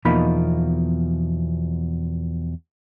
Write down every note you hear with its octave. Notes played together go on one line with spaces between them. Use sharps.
E2 B2 F3 A#3 D#4 B5